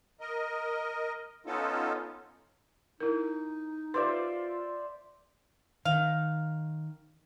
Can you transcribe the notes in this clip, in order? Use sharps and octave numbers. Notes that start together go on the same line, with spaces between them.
A#4 D#5
B3 C#4 D#4 F4 A4
D#4 E4 A#4
F4 G4 B4 C5 D5 E5
D#3 F5